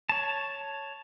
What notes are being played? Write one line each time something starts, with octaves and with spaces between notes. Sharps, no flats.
C#5 A5